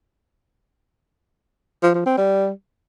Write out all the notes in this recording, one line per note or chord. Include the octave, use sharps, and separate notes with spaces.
F3
F3
C4
G3